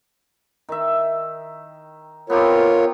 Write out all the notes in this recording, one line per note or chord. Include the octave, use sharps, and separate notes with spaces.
D#3 E5
B3 C4 F4 G4 A#4 C#5